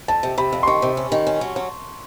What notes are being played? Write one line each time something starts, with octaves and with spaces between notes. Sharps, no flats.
F2 A5
C3
C3 B5
F2
C6
D#3 C#6
C3
C#4
D#3
C#4
F#3
F#3